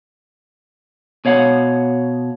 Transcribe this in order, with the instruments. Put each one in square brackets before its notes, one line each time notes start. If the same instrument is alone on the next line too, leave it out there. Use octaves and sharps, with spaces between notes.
[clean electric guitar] B2 C#5 F5 F#5